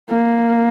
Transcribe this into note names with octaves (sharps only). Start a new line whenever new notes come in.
A#3